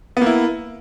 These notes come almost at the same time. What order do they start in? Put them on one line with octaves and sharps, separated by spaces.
B3 A#3 E4